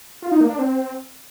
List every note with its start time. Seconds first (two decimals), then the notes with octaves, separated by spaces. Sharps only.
0.22 F4
0.32 D#4
0.41 A#3
0.50 D4
0.59 C4